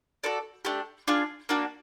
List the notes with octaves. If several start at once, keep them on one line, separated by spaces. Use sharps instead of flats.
F#4 A4 D5
A3 D4 G4
D4 F4 G#4
A#3 D4 F#4